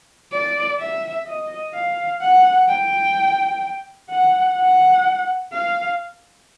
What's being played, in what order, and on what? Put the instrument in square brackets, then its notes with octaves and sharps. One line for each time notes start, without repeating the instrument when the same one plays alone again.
[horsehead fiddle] D5
E5
D#5
F5
F#5
G5
F#5
F#5
F5